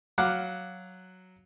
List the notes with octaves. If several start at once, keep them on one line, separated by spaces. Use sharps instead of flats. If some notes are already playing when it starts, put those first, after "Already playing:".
F#3 F5 F#5 D6